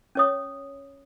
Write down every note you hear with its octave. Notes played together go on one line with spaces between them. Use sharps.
C#4 C#5 D#6